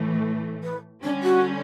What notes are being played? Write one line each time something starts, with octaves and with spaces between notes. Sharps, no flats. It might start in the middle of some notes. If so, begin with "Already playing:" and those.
Already playing: A2 E3 A3
B4
D3 G3 C#4 D4
F#4